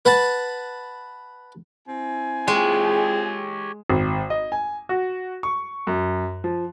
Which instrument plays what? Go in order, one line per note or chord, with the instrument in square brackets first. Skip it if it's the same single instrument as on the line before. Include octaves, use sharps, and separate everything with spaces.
[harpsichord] B4 F#5 A5
[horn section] C4 E4 G#5
[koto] G#3 [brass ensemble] F4 G#4 G5 [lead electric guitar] G4 C#5
[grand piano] G#1
D#5
G#5
F#4
C#6
F#2
F3